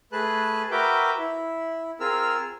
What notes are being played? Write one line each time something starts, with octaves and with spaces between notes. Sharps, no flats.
A3 G#4 B4 A5 F#6
F#4 A#4 B4 E5 G5 D6
E4
C4 F4 G#4 A#4 E6 F6